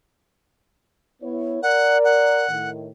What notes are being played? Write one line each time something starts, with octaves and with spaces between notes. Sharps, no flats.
B3 E4 C#5
A#4 D5 F#5
F#5
A2 D#3